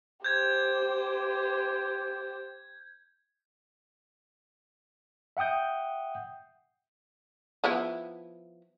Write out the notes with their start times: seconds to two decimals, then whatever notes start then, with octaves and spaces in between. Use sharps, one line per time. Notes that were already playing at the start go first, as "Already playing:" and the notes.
0.24 G4 C5 G6 G#6
5.37 E5 F#5 G5 D#6 G6
7.64 F3 B3 E4